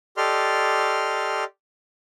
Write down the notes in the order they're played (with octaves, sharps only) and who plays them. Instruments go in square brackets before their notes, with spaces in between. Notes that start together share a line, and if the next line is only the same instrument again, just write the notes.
[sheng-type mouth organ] G4 A4 D5 D#5 C6 F6